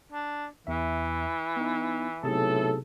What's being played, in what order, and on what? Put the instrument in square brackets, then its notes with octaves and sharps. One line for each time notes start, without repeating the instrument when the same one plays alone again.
[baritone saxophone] D4
[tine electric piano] E2 E5 [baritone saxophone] E3
[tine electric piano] B3 D#4
[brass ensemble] B1 A2 A4 [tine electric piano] C3 G#4 A5